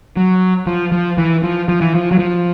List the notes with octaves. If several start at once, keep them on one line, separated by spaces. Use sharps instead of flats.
F#3
F3
F3
E3
F3
F3
E3
F3
F#3
F3